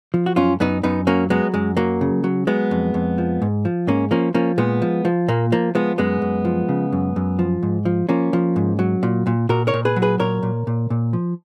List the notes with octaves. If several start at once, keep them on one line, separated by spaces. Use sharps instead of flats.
F3
F#4
F#2 C#4 F4
F#2 B3 D#4
F#2 B3 D#4
F#3 A#3 C#4
F#3 G#3 B3
F#2 G#3
F#3 A#3
C#3
F#3
F#3 G#3 B3
F2
F2
F3
G#2
F3
G#2 A#3 C#4
F3 A#3 C#4
F3 A#3 C#4
A#2 G#3 B3
F3
F3
A#2 A#3
F3 A#3
F3 G#3 B3
F#2 G#3 B3
F#2
F3
C#3
F#2
F#2
F3
G#2
F3
F3 A#3 C#4
F3
G#2
F#3
A#2
A#2
A#2 F#4 A#4
A#4 C#5
A#2
G#4 B4
F#3
G#4 B4
A#2 A#4 C#5
A#2
A#2
A#2
F3